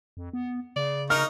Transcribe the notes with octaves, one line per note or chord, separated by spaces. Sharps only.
F2
B3
C#3 D5
D#4 A#4 C#6 F6